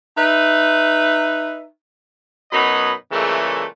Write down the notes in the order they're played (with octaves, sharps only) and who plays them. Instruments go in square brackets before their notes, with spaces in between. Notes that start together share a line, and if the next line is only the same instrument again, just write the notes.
[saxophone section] D#4 B4 E5
[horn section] F#2 B2 F#3 D#4 D#5 B5
A#2 C#3 E3 G#3 A3